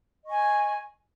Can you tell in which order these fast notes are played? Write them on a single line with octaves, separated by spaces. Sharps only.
D#5 C#6 G#5